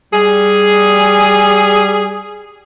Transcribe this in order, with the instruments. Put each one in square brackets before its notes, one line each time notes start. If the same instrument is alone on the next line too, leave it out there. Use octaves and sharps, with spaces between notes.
[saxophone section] G3 G#4